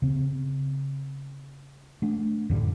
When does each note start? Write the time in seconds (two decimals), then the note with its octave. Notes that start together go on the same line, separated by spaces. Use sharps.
0.02 C#3 C4
2.02 A3 D4
2.49 F#2 A2 D3 G3